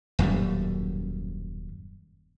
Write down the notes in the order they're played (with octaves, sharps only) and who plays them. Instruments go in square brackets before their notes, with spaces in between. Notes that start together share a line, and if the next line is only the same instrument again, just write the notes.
[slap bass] D#1 F#2 A2 G3